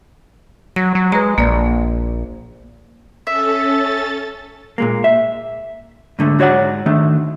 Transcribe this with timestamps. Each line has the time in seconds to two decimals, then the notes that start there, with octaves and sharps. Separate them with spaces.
0.76 F#3 A#6
0.95 F#3
1.12 G#3 B4 A#5
1.38 A#1 A#3 D5
3.27 C#4 A4 E5 A6
4.78 A#2 G#3 A#3
5.04 E5
6.19 G#2 D3 A3
6.39 G#2 F#4 C#5 D5 F#5
6.86 D#3 A3 D4